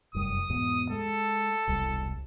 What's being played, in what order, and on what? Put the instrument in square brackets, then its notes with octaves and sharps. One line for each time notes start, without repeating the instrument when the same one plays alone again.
[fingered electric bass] F1 F#2 G3 [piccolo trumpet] D#6
[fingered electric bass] E2 G#2 B2
[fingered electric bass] G#3 [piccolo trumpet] A4
[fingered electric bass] E1 C2 G3